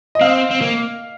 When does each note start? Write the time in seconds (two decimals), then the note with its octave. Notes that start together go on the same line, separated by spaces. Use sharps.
0.15 D#5
0.21 C4 F5
0.51 C4
0.61 A#3